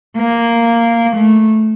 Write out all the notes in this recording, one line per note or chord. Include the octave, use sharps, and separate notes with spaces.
A#3
A3